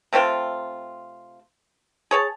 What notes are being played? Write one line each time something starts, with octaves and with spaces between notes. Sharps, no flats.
C3 A3 C4 F4
G#4 C#5 A5